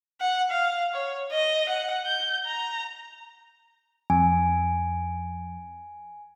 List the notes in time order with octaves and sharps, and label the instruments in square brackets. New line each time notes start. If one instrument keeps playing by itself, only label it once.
[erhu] F#5
F5
C#5
D#5
F#5
G6
A#5
[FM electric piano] F2 [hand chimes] G#5